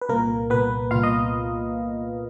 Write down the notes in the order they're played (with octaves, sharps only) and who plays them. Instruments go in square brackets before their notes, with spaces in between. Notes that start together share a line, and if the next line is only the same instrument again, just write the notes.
[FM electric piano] B4
C2 A#2 A#3 A#4
C2 A#2 B3 B4
C2 A#2 F4 F5
D#5